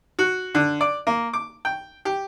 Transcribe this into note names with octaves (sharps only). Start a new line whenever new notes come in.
F#4
D3
D5
A#3
D6
G5
G4